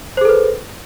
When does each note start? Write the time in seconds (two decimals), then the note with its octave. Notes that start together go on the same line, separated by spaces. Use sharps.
0.17 C5
0.21 G#4
0.25 A4
0.29 B4